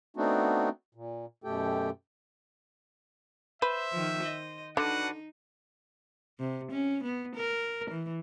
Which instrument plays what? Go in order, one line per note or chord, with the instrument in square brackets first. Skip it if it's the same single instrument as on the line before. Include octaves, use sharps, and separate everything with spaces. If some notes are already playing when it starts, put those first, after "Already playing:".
[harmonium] A3 B3 C4 D4 D#4 F#4
A#2
F#2 B2 A3 G4 A4 G5
[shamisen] B4 [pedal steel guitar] C5 [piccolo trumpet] E5
[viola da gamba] D#3 F3
D#5
[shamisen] D3 [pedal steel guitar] D4 F#4 B4 [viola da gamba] D#4 [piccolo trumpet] F#5
[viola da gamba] C3
C#4
B3
A#4
E3